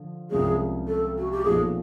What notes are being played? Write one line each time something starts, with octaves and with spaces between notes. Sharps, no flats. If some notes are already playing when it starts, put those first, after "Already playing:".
Already playing: D3 F3
C2 C3 F3 G#3 C#4 G#4
A4
F#4
G4
B1 A#2 F3 A3 G#4